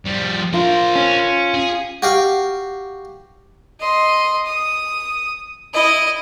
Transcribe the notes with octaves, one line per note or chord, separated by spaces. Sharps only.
F3 G3
F4 A#4 C5
C#4
G#4
F#4 G4 F5
D#5 C6
D#6
E4 D#5